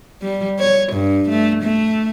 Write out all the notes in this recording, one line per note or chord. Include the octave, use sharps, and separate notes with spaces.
G3
C#5
G2
A3
A3